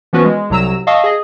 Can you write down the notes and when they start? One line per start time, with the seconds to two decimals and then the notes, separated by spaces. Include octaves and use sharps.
0.13 E3 F3 B3 C#4 F#4 B4
0.25 G#3
0.50 C2 C3 F#3 A#5 E6 E7
0.87 D#5 F5 A5 C#6 D#6 E6
1.04 G#4 D#5